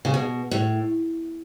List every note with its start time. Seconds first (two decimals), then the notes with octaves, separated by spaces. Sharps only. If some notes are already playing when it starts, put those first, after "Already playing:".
0.05 C#3
0.14 B2
0.51 A2